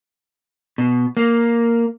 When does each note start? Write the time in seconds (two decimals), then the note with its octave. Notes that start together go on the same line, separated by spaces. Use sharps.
0.78 B2
1.17 A#3